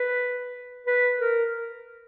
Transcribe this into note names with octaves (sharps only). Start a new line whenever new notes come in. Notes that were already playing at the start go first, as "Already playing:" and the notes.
Already playing: B4
B4
A#4